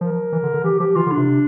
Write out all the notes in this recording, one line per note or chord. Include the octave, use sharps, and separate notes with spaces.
F3 A#4
E3
D3
D3
E3 G4
F3 G4
E3 F4
D3
D4
C3